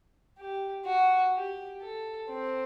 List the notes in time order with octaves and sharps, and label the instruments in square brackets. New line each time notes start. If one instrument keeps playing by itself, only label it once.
[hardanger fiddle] G4
F#4
G4
A4
C4